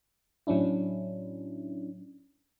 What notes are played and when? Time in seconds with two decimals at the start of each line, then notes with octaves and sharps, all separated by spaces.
0.47 A2 F#3 C#4 D4 E4